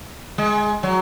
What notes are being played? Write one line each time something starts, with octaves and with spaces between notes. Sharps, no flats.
G#3
F#3